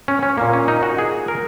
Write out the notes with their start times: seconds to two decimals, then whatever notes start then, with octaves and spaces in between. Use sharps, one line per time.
0.08 C#4
0.23 C#4
0.38 A#2 A#3
0.53 C#4
0.68 D#4
0.83 F#4
0.99 G#4
1.28 A#4